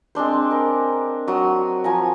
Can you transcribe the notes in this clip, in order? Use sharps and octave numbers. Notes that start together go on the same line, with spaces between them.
G#3 C4 D4 C5
A#4
F#3 D#6
F3 G#5 A#5